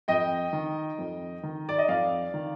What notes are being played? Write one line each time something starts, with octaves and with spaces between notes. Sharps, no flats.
F2 D#5 G5
D#3
F2
D#3
D5
D#5
F2 D5 F5
D#3